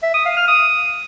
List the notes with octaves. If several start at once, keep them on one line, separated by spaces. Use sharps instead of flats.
E5
D#6
F5
F6
D#6